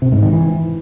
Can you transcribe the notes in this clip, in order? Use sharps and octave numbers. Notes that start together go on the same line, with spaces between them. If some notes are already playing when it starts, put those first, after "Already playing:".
C3
G#2
D#3
E3